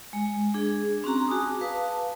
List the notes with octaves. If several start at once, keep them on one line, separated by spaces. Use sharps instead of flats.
G#3
D4 G#4
C4 C#4 F#4 A#5
F#4 G#4 G#5 A5 D6 D#6
B4 F5 A5